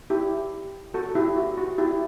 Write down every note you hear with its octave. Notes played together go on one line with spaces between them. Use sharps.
E4 G4
F#4 A4
E4 G4
F#4
F#4
E4 G4